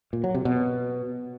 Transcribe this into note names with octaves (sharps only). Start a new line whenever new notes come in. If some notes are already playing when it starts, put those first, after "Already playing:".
A#2
F#3
C3
B2